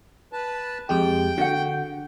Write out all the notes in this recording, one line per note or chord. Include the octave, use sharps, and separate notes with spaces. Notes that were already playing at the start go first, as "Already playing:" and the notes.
B4 A5
F2 G#3 G4 G5
D3 F#4 F#5